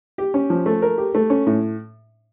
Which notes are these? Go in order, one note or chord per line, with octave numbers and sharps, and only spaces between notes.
G4
C#4
F3
A3
A#4
G4
A3
C#4
A2